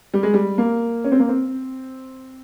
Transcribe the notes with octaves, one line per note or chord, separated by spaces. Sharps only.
G3
G#3
G3
A#3
C#4
C4
A#3
C4